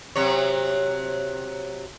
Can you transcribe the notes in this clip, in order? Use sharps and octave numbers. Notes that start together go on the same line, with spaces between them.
C3 F#3 C#5